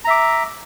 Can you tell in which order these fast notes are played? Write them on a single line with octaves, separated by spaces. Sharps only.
A#5 E5 D6